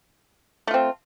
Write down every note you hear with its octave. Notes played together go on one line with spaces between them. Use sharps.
A3 C4 F4